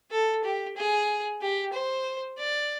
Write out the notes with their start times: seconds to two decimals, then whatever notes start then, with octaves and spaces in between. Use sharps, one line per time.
0.11 A4
0.44 G4
0.77 G#4
1.42 G4
1.73 C5
2.39 D5